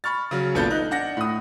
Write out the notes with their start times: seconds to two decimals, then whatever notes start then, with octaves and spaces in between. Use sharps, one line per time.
0.04 B5 C#6 F6 A6
0.31 C#3 F#3
0.55 G#1 A#2 B3 D4 A4 G6
0.70 D#4 F#6
0.91 D4 F#5 A#6
1.17 A2 D#6